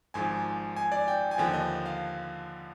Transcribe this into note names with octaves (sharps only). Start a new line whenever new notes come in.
G#1 G#2 F3 G#5
G#5
D5
G5
G#5
D#2 D3 F3 G5
D#5
F5